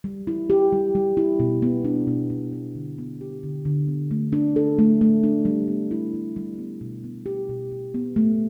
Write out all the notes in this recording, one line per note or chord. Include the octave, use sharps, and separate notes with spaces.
G3
E4
G4
G3
G3
E4
B2
B3
D4
B2
B2
B3
D3
B3
G4
D3
D3
B3
A3
D4
A4
A3
A3
D4
G3
B3
E4
G3
G3
B3
B2
B3
G4
B2
B2
B3
A3